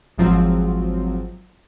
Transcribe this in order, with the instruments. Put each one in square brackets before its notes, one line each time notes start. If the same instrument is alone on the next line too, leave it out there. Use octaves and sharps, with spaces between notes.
[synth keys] G#1 G#2 F3 F#3 C4